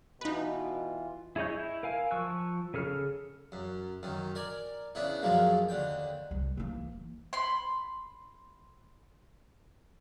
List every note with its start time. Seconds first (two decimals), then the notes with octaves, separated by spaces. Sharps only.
0.21 B2 E3 D#4 F4 B4
1.36 E4 G#4 C#5 D#5 G6
1.59 E4
1.83 A#4 F5 G#5
2.11 F3 C#6 E6 F#6
2.74 C#3 G#4 A4 F6
3.52 F#2
4.03 F#2 D#3
4.35 A#4 D5 G#5
4.95 C#3 B3 D4 E4
5.22 F#2 F3 F#3 G#3 A#3
5.69 D#2 D3 G5
6.31 C2 G#3
6.57 E3 A#3
6.92 E3
7.33 B5 C6